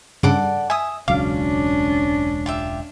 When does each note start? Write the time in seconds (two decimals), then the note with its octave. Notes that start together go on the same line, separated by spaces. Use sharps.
0.23 G2 C#3 A4 D5 F#5 D7
0.70 E5 G#5 D#6
1.08 E1 C#2 F#3 C#4 D4 F5 D6
2.46 F4 G4 E5